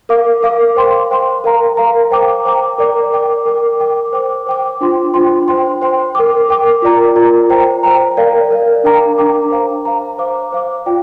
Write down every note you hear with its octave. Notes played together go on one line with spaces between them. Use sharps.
A#4 F5 D6
A#4 F5 D6
C5 G5 C6
C5 G5 C6
A#4 F5 A#5
A#4 F5 A#5
C5 G5 A#5 D6
C5 G5 A#5 D6
A#4 D5 G5 D6
A#4 D5 G5 D6
A#4 G5 D6
A#4 G5 D6
C5 G5 D6
C5 G5 D6
D4 F4 C5 G5 C6
D4 F4 C5 G5 C6
C5 G5 C6
C5 G5 C6
A#4 G5 D6
A#4 G5 D6
F4 A#4 D5 A#5
F4 A#4 D5 A#5
C5 G5 A#5
C5 G5 A#5
A#4 D5 F5
A#4 D5 F5
D4 A#4 G5 A#5 D6
D4 A#4 G5 A#5 D6
C5 F5 A#5
C5 F5 A#5
C5 F5 D6
C5 F5 D6
F4 D5 G5